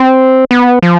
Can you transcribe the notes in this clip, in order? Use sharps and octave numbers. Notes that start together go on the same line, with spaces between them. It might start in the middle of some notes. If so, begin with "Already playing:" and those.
Already playing: C4
B3
F3